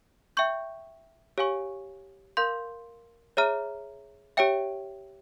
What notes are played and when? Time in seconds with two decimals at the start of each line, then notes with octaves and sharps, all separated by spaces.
0.37 E5 G5 C#6 G6
1.38 G4 C#5 F5 G#5 C#6
2.37 A#4 F5 C6 G6
3.37 G#4 C#5 E5 A#5 F6
4.37 G4 C#5 E5 G5